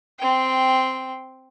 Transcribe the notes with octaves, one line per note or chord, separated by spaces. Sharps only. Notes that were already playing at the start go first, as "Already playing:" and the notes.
C4 G5